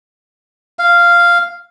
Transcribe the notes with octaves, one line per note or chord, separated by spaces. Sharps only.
F5